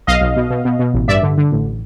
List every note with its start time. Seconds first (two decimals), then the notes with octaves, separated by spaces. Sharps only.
0.07 B1 D#5 F5
0.21 B1
0.36 B2
0.50 B2
0.65 B2
0.79 B2
0.94 A1
1.08 G2 D5 E5
1.23 D3
1.38 D3
1.52 A1